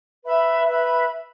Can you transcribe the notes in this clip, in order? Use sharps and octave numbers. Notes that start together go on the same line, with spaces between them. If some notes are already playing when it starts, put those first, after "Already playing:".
B4 E5 B5
B4 E5 B5